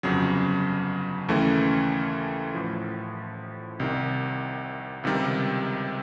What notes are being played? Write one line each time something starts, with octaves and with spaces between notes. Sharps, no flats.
G1 F2 C#3 F#3
D#2 C#3 E3 A3 C#4
A1 A2 F3
C2 C3 D#3
C#2 C3 D#3 G3